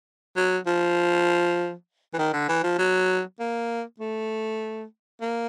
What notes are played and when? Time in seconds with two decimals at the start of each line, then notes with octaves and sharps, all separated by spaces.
0.36 F#3
0.67 F3
2.14 E3
2.18 D#3
2.33 D3
2.49 E3
2.64 F3
2.78 F#3
3.40 A#3
3.99 A3
5.21 A#3